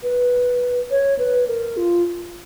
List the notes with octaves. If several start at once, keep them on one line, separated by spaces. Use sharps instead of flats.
B4
C#5
B4
A#4
F4